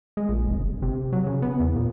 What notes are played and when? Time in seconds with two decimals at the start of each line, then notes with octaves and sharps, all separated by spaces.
0.17 G#3
0.29 A#1
0.47 F1
0.59 G1
0.82 C3
1.13 F#3
1.27 C#3
1.42 B3
1.60 E2
1.76 A#2